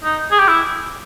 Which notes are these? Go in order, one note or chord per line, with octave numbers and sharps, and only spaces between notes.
D#4
G#4
G4
E4